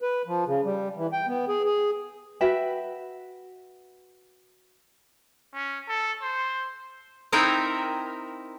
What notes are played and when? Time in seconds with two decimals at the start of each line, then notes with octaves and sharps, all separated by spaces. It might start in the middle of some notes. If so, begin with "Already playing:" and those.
0.02 B4
0.27 F3
0.47 C#3
0.64 G3
0.97 E3
1.13 G5
1.27 B3
1.48 G#4
1.65 G#4
2.41 F#4 B4 E5 G5
5.53 C#4
5.88 A4
6.22 C5
7.32 C4 D#4 E4 A#4 G5